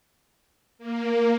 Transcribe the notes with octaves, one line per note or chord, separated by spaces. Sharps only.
A#3